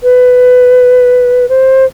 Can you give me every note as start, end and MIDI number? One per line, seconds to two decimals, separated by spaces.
0.03 1.48 71
1.49 1.84 72